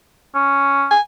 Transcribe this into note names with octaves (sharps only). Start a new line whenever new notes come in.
C#4
G#5